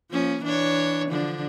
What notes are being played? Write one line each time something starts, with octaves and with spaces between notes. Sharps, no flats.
F3 A#3 C#4
E3 D4 C#5
D3 F3 D4